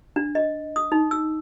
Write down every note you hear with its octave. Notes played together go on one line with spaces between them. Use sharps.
D4
D#5
D#6
D#4
E6